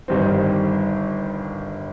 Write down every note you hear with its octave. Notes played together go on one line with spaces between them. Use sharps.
G1 G2 D#3 G3 C4